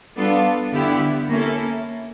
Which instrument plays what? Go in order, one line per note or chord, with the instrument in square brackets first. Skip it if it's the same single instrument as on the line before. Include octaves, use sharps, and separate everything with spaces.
[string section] G3 B3 D4 F4 A4
D3 G3 B3 E4 G4
A#3 C#4 E4 A4